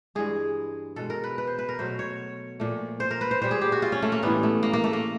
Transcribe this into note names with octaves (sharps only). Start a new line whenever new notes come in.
G2 E3 G#3 G#4
B2 G#3 A4
A#4
B4
B4
C5
B4
A#4
B2 F#3 A3 C5
C#5
A#2 F3 A3
C5
A#4
B4
C5
A#2 G3 C5
G#4
G4
F#4
F4
C#4
A3
A#3
A2 E3 G3 B3
A3
A#3
A#3
A3
A#3